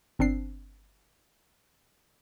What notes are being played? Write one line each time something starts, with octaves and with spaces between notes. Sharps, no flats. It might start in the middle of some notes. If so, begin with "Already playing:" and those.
G1 C4 D4 C7